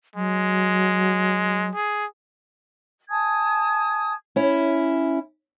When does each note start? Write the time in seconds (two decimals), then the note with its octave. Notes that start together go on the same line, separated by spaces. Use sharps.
0.16 F#3 G#3
1.74 G#4
3.10 G#5 A5 D#6 G#6
4.36 C#4 E4